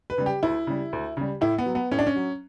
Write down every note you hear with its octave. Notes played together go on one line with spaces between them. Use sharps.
B4
C#3 G3
G4
D2 E4
C#3 G3
D2
C#3 G3
A2 E4
B3
F#3
B3
A2 C#4
D4
C#4
F#3